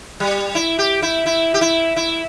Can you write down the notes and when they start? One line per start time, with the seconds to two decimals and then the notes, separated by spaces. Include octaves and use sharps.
0.20 G3
0.55 E4
0.79 G4
1.02 E4
1.26 E4
1.54 G4
1.61 E4
1.96 E4